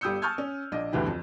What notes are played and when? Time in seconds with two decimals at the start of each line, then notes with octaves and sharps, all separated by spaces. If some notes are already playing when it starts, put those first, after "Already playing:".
0.01 G1 G3 D#6 E6 G6 C#7
0.22 A5 C#6 D#6 F6 G6 G#6
0.38 C#4
0.72 A#1 D4 D#5
0.92 D2 G2 D3 E3 G3
1.06 F2